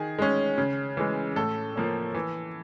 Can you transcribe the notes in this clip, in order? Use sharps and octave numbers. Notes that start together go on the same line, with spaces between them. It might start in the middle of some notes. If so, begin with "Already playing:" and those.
Already playing: D#3 G#4
G#3 C#4
C#3
E3 G#3
A2 A4
F3 A#3 C#4
E3